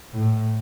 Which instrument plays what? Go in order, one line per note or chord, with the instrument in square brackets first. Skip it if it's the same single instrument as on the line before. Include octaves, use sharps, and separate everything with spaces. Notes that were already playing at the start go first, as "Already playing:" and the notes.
[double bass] A2